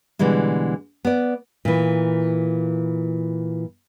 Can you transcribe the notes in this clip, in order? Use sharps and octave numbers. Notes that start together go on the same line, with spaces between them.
B2 D3 E3 G3 G#3
B3 D5
A#2 E3